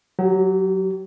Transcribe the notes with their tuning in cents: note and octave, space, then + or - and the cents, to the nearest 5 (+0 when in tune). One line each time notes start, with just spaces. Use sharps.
F#3 +0 G4 -40